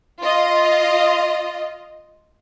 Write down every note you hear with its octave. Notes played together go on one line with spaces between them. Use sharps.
F4 D#5